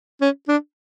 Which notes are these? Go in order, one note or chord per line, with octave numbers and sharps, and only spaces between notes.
C#4
D4